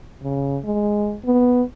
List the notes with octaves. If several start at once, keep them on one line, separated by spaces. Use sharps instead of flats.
C#3
G#3
B3